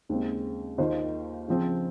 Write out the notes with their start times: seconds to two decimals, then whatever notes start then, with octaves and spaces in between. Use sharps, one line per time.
0.09 D#2 C#3 G#3 C4
0.78 D#2 D#3 A#3 F4 C5
1.48 C#3 F3 C4